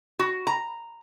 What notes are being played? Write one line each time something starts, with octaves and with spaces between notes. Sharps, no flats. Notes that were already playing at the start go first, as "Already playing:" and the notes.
F#4
A#5